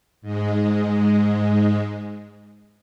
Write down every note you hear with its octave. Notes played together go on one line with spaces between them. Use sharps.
G#2 G#3